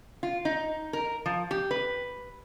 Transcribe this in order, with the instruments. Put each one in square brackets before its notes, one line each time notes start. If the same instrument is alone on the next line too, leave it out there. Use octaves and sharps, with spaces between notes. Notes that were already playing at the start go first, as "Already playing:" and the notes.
[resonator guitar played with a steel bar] F4
D#4
A#4
F3
G4
B4